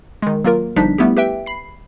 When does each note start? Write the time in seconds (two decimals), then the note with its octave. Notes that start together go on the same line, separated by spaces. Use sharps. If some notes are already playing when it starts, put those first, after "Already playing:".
0.22 D#3 G#3
0.44 F#3 A#3 F4 A#4
0.76 G1 F3 G3 D4 D#4 B6
0.98 G3 A3 B3 E4 G4
1.17 G4 B4 E5 G5
1.46 B5 C7